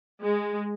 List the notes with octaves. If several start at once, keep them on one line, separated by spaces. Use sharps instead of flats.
G#3